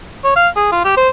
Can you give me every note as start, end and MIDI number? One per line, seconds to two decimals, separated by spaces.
0.24 0.32 73
0.36 0.48 77
0.56 0.71 68
0.72 0.82 65
0.85 0.94 67
0.97 1.09 72